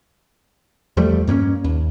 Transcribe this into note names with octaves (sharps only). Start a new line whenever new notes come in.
E2 F3 G3 A3
G2 A#3 C4 C#4
D#2